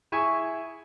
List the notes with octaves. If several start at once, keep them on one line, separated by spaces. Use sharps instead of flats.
E4 G#4 E5 G#5 C#6